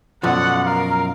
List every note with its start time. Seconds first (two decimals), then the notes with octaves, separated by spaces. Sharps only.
0.23 F#2 B2 F3 B3 A4 D5 F#5
0.66 A#4 F5